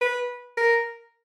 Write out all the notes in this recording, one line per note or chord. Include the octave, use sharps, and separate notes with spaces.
B4
A#4